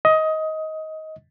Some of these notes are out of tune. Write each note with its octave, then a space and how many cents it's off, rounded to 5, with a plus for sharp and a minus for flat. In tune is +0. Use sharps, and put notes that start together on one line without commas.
D#5 +20